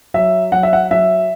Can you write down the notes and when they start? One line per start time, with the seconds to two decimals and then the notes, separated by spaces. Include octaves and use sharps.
0.14 F#3 E5
0.52 F#3 F#5
0.63 E5
0.73 F#5
0.91 F#3 E5